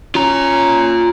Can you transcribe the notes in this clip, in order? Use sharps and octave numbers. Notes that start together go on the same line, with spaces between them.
C#4 F4 A#5